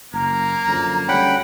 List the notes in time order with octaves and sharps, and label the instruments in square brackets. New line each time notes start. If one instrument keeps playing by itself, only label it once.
[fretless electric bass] F#1 [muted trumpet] A#3 [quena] A#5
[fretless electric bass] F#2 D3 F3
[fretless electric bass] D2 G3 C#4 [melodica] F#5 G5 B5